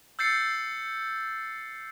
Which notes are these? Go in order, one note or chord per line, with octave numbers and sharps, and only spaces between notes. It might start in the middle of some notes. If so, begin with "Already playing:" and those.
E6 G6 A6 C7 C#7